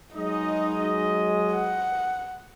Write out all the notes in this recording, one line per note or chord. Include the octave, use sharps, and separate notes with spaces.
F#3 G#3 D#4 D#5
F#5